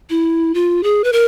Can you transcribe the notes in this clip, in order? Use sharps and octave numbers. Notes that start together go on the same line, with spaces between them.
E4
F4
G#4
B4
A#4